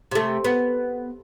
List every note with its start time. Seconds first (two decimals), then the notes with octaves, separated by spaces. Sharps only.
0.11 C3 A3
0.44 B3